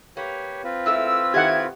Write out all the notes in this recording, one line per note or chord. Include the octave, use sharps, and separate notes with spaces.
A#3 G4 B4 C#5
C4 F4 B4
G#3 A3 E4 E6
D#3 A3 E4 G4 E5 F#5 G#6